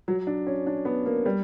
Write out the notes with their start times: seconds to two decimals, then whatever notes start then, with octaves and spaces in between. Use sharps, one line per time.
0.08 F#3
0.27 D4
0.47 C#4
0.67 D4
0.85 B3
1.06 A#3
1.26 G3